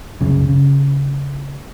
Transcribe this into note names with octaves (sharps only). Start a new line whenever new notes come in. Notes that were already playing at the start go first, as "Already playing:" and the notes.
C2 F#2 C#3
C#3